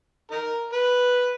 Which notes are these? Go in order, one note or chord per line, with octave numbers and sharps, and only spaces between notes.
D#4 A#4
B4